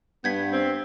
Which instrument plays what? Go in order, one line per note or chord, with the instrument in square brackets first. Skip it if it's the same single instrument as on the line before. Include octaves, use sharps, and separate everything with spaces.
[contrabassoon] G2 [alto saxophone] B3 [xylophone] G6 G#6 B6
[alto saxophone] C4